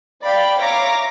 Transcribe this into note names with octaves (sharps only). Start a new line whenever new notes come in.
D5 F5 G5 B5
C#5 E5 F5 A#5 D6 A#6